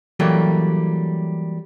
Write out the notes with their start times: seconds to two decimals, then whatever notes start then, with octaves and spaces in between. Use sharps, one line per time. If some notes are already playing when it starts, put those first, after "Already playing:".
0.20 E3 F#3 G3 A#3 A4